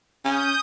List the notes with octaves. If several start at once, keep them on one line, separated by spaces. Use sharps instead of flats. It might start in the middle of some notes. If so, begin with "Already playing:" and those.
C#4 D#6 G6